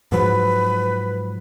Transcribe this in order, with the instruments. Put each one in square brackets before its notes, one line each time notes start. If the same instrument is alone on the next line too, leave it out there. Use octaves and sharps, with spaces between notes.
[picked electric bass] G#2 F3 F#3 [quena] B4